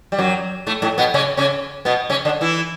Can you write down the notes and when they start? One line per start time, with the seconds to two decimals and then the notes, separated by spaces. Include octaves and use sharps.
0.12 G3
0.19 F#2 F#3
0.67 A2 A3
0.82 A2 A3
0.98 B2 B3
1.14 C#3 C#4
1.37 C#3 C#4
1.85 B2 B3
2.10 C#3 C#4
2.25 D3 D4
2.41 E3 E4